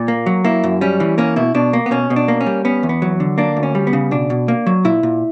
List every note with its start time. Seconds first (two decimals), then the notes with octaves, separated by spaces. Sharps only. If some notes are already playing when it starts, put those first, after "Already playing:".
Already playing: A#2
0.08 A#3
0.26 F#3
0.45 A#3 E4
0.64 F#2
0.81 G3 C#4
1.00 E3
1.18 A#3 C#4
1.36 B2 E4
1.55 B2 D4
1.73 A#3
1.86 B3
1.91 B2 C#4
2.10 B2
2.16 D4
2.28 A#3
2.41 C#4
2.46 G3
2.65 B3 C#4
2.83 E2
2.89 B3
3.02 F#3
3.20 D3
3.38 A#3 D4
3.57 D2
3.63 C#4
3.75 G3
3.87 B3
3.93 C#3
4.11 B2 D4
4.30 B2
4.48 A#3
4.67 F#3
4.85 A#2 E4
5.03 A#2